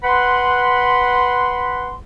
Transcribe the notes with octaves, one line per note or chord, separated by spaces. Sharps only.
B4 F#5 B5 C6